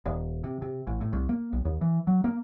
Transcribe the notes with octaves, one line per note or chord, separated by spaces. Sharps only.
D#1
C3
C3
A1
A2
C2
A#3
B1
D#2
E3
F#3
A#3